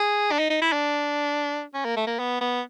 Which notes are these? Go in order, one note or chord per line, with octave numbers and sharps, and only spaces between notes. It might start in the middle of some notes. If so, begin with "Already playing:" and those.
Already playing: G#4
D4
D#4
D#4
E4
D4
C#4
A#3
A3
A#3
B3
B3